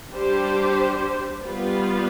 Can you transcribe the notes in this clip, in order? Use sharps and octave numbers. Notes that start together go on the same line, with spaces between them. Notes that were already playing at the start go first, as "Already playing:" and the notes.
G3 D4 G4 C5
G3 B3 F4 B4